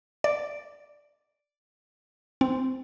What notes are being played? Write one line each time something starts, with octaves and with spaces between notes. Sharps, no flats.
D5
C4